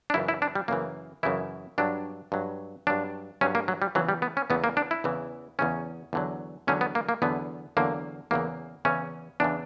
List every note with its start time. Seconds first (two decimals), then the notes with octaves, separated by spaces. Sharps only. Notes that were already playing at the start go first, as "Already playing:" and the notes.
0.10 D4
0.14 F#2 C#3 E3 E4
0.28 E4
0.42 D4
0.55 G3
0.68 F#2 C#3 E3 A#3
1.23 F#2 C#3 E3 E4
1.78 G2 F#3 D4
2.32 G2 F#3
2.87 G2 F#3 D4
3.41 G2 F#3 C#4
3.55 A#3
3.68 F#3
3.82 G3
3.95 E2 C#3 E3 F#3
4.09 G3
4.22 B3
4.37 C#4
4.50 E2 C#3 E3 B3
4.64 A#3
4.77 D4
4.91 E4
5.04 E2 C#3 E3
5.59 E2 C#3 E3 C#4
6.13 E2 D3 F#3
6.67 E2 D3 F#3 C#4
6.81 B3
6.95 A#3
7.09 A#3
7.22 E2 D3 F#3 B3
7.77 E2 D3 F#3 A#3
8.31 E2 C#3 E3 A#3
8.85 E2 C#3 E3 C#4
9.40 E2 C#3 E3 D4